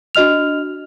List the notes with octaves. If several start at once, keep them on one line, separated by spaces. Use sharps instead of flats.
D4 F#4 D#5 F6 F7